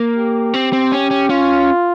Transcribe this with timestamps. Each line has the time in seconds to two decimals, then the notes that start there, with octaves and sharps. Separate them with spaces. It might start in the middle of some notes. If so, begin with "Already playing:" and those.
Already playing: A#3
0.15 G4
0.54 C4
0.73 C4
0.92 C#4
1.11 C#4
1.29 C#4 F4